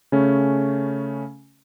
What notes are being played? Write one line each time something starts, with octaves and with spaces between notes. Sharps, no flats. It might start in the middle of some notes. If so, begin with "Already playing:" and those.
C#3 A3 C#4